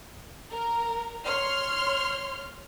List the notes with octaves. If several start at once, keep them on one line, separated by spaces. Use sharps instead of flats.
A#4
C#5 C6 F6